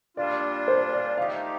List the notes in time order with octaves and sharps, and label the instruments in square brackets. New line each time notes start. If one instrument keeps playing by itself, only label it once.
[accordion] A#2 G3 D4 F4 [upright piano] D5
[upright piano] C5
D5
[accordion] D#3 A3 D#4 G4 [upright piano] F5